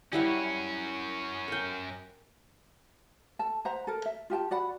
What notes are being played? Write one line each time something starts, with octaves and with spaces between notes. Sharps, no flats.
F#2 G3 C#4 E4 F#5
A#4 G5
A4 A5
C5 E5 F#5 A#5
A4 A#4
E5
F4 G4 G5 A5
F#4 D5 F#5 B5